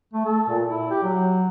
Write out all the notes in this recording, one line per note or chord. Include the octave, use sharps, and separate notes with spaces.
A3
A4
A#2
E4
G4
F#3